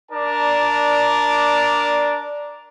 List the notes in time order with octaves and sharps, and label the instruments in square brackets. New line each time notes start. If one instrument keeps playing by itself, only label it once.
[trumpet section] D4 A#4 D5 A5